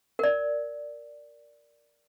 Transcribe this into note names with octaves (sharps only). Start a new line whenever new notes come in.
A#4 D5